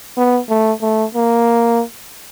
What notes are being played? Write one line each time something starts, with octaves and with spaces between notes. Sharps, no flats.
B3
A3
A3
A#3